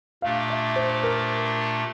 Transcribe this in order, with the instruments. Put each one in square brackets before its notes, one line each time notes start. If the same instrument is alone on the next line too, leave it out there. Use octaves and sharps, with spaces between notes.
[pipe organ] A#2 A3 D4 G4 [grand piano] F5
[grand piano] E5
C5
A#4